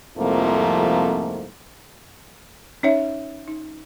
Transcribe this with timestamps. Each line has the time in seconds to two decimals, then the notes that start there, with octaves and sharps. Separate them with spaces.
0.17 C2 F2 G#2 F3 A3 A#3
2.83 C#4 D#4 C#5 E5
3.48 D#4